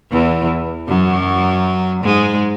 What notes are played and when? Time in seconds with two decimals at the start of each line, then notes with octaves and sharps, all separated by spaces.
0.11 E2 E3
0.88 F#2 F#3
2.03 G#2 G#3